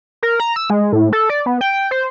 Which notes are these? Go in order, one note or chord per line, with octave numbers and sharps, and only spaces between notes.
A#4
A#5
E6
G#3
A2
A4
D5
B3
G5
C5